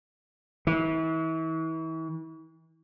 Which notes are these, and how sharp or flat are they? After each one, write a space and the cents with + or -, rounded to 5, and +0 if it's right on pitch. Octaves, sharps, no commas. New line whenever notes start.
E3 -35